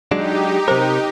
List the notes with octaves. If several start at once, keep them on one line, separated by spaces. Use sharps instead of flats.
F#3 G#3 D4 D#4 G4
C3 A#4 C5 A#5